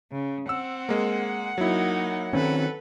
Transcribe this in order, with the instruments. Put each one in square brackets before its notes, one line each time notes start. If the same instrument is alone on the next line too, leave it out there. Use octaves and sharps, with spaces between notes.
[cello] C#3
[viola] C4 [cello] F#5 [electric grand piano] E6
[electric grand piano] G#3 A#3
[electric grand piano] F#3 E4 [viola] A#3 D#4
[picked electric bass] D#3 C4 C#4 [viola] A4 B4